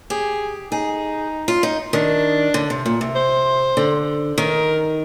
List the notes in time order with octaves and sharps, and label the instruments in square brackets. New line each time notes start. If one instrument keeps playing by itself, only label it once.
[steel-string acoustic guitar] G4 [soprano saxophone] G#4
[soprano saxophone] D#4 [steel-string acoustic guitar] G#4
[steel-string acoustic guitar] F4
D#4
[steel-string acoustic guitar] D#3 [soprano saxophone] D4
[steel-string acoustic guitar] D3
C3
A#2
C3
[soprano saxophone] C5
[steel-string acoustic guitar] D3
[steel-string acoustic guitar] D#3 [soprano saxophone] A#4